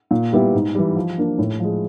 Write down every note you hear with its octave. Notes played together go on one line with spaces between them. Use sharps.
A#2
G3 B3 E4 G4
G#2
E3 G3
F3
A#3 D4
A2
F3 G#3